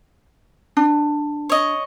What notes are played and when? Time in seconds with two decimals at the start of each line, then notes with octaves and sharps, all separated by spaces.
0.77 D4
1.49 C#5 D#5